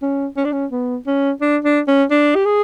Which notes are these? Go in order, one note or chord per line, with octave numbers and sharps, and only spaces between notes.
C#4
C#4
D4
C#4
B3
C#4
D4
D4
C#4
D4
G4
G#4